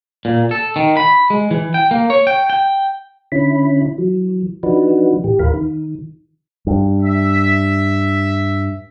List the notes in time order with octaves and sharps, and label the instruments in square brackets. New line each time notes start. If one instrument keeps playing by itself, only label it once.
[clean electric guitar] A#2
A4
D#3
B5
G#3
E3
G5
A#3
C#5
G5
G5
[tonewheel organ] D3 C#4 E4 B5
E3 F#3
E3 F3 D4 D#4 F#4 B4
A2 E3 G4
D#2 A#4 F5 B5
D#3
[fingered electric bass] G2
[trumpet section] E5